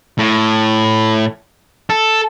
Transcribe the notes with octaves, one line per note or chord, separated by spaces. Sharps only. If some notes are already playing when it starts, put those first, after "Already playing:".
A2
A4